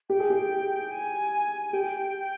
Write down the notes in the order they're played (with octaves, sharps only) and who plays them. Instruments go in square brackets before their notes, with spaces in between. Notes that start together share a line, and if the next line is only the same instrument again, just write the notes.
[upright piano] G4 [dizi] G5
[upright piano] G#4
G4
[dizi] G#5
[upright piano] G4 [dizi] G5